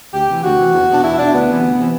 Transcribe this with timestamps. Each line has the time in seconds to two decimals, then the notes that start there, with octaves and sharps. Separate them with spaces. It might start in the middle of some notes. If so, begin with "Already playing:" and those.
0.13 D2 G4
0.28 C3 E3
0.43 D2 F#4
0.58 C3 E3
0.73 E2
0.88 B2 D4
1.03 E2 E4
1.18 B2 D4
1.33 D2 B3
1.48 C3 E3
1.63 D2
1.78 C3 E3